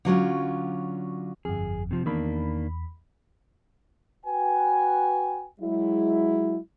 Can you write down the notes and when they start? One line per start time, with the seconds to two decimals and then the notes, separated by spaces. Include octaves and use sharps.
0.05 D3 F#3 C#4 F4
1.45 G1 F2 G#4
1.91 C3 F3
2.06 E2 D#3 A#3 D4 B5
4.26 F#4 B4 G5 G#5
5.60 F#3 G#3 E4